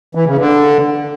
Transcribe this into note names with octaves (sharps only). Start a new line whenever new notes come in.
E3
C#3
D3